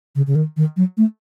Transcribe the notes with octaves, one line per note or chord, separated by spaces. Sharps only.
C#3
C#3
D#3
D#3
F#3
A3